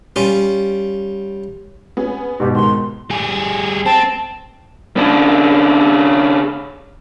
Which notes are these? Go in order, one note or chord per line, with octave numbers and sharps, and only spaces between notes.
G3 C#4 F4
B3 C#4 G#4
G#2 B2 G4
C#2 D#3 C6
G3 G#4
C4 A5
C#3 D4